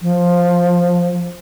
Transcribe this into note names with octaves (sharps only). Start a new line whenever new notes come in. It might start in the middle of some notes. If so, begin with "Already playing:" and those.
F3